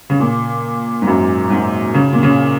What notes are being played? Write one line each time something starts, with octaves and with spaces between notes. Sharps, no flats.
C#3
A#2
G#2
F#2
G#2
C#3
A#2
C#3